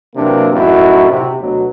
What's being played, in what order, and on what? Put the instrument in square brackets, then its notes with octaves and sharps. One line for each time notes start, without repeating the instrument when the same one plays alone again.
[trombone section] C3 E3 F#3 A#3 C4 D4
F#2 A2 D#4 E4 F#4
C3
D2 B2 F#3